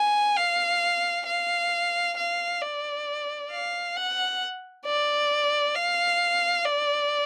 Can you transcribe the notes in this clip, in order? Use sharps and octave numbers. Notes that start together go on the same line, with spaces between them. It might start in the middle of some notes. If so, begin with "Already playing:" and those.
Already playing: G#5
F5
F5
F5
D5
F5
F#5
D5
F5
D5